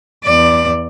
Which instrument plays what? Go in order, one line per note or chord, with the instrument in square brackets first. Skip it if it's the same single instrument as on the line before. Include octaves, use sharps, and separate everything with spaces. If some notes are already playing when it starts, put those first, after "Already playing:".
[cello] E2 D5